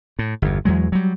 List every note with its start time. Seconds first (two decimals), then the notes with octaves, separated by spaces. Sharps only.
0.19 A2
0.42 G1 E2
0.65 E2 F#3 G#3
0.92 F#3 G3